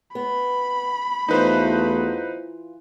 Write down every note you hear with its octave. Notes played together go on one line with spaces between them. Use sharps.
B3 B5
E2 E3 F#3 A3 D#4 F4 B4 C5